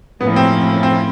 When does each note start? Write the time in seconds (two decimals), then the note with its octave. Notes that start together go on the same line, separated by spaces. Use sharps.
0.21 A2 F3 A#3 B3 C#4 E4
0.36 C4
0.83 C4